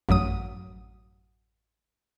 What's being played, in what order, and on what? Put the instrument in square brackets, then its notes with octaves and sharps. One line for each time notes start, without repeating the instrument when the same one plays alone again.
[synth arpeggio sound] A1 F#2 F#3 D#6